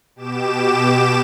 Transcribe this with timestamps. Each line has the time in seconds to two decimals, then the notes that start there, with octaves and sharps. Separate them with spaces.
0.16 B2 G4 D6 E7